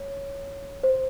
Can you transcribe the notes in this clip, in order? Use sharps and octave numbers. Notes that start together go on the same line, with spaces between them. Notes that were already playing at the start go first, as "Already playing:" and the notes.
Already playing: C#5
C5